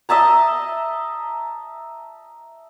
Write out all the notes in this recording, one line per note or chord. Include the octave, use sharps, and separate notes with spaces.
D#5 E5 A5 A#5